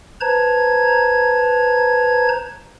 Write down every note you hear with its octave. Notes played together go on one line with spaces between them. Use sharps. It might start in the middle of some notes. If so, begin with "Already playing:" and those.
B4 C5 A5 A#5 G#6